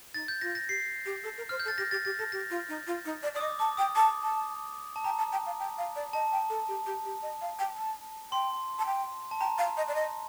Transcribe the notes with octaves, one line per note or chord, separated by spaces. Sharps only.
D#4 A6
G6
F4 A#6
A#6
G4 C7
G4
A4
A#4
C5 F6
G6
A4
A6
G4 A#6
G4 A6
G4 A6
A4 A#6
G4 A#6
F4
D#4
F4
D#4
D5
D5 D#6
D#5 D6
A5 D6
G5 D#6
A5 D6
A5
A5
G5 A#5
A5
G5
F5
G5
F5
D5
D#5 A5
G5
A4
G4
G4
G4
D#5
F5
G5
A5
G5 C6
A5
G5
A5
G5 A#5
F5
D#5
D5
D#5